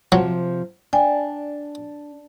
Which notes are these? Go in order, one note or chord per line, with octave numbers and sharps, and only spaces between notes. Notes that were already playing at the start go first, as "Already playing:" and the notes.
C3 F3 F#3
D4 D5 G5 G#5